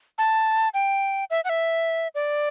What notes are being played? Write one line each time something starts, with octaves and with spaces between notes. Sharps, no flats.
A5
G5
E5
F#5
E5
D5